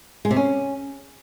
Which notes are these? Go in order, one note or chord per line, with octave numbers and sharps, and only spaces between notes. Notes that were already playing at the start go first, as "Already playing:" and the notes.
G#3
C3
C#4